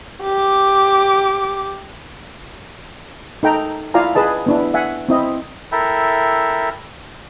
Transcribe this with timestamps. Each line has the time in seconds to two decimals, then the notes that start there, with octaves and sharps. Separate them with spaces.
0.23 G4 D6
3.43 D#4 A4 G5 A#5
3.94 E4 F4 D5 F5 G#5 A#5
4.15 G#4 B4 D#5 A5
4.46 B3 D4 E4
4.74 E5 F#5 G#5
5.09 C4 E4 D#5
5.72 E4 A4 A#4 E5 G5